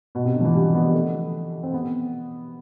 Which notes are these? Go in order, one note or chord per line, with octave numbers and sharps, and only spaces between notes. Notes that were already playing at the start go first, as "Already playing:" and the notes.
B2
C3
D3
F3
E3
G3
B3
A3
C4
B3